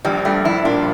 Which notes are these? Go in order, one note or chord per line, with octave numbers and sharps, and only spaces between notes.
A#1 G3
G3 A3
A#1 E4
A#2 D4